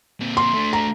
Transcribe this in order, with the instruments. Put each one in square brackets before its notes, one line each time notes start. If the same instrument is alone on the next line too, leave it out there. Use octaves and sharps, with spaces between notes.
[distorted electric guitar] A#2 C4
[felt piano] C6
[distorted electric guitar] A3 D4
[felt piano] A#5